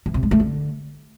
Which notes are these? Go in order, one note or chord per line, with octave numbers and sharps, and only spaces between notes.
E3
C3
G#3
A3
D3